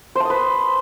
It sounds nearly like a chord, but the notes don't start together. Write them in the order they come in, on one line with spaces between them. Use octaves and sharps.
C5 A5 D#6 B4